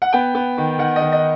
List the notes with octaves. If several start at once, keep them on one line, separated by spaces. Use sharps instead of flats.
F#5
B3 G5
B3
D#3
D#3 F#5
D#5
D#3
D#5